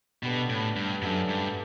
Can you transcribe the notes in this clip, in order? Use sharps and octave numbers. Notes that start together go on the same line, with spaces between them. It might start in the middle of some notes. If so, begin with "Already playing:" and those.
B2 D3 G3 B3 D4
A2
G2
F#2 D3 F#3 A3 D4
G2